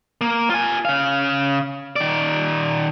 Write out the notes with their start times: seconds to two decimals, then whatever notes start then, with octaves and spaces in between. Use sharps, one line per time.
0.21 A#3
0.50 F4 G#5
0.85 C#3 F5
1.96 D#3 D5